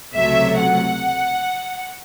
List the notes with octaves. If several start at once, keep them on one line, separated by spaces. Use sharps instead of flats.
C#2 C3 F#3 A3 E5
F#5